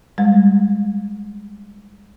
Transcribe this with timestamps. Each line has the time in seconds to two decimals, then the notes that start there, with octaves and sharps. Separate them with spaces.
0.18 G3 G#3